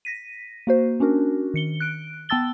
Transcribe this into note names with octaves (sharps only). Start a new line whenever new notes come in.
A#6 B6 D#7
A#3 F#4 C5
C#4 D4 F#4 A#4
D#3 C#7 G7
F#6 D7
B3 G5 A5 E6 A6 G7